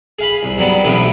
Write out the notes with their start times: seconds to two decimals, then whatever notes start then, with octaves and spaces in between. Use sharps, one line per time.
0.19 G#4 F5 B5
0.43 C2
0.58 G2 F#3 G3 B3
0.84 B1 A2 C3 E3 B3